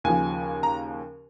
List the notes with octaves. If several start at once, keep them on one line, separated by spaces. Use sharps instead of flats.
D#2 C#3 F3 G#5
A#5